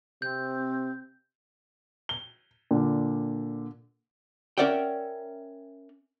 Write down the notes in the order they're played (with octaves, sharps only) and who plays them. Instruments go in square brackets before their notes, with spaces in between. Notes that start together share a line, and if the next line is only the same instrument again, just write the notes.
[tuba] C3 [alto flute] C4 [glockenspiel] G6
[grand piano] G7
A#2 D3
[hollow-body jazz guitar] C#4 A#4 D5 E5 F#5 G5